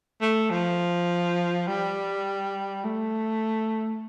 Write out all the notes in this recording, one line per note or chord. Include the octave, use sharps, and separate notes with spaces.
A3
F3
G3
A3